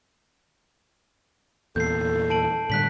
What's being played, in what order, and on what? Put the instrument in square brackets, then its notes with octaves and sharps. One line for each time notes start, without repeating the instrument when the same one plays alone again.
[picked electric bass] E2 A#2 [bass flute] A4 [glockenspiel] G6 C7
[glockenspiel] A5 D7 F#7
[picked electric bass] A2 D3 G3 [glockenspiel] F#6 B6 F#7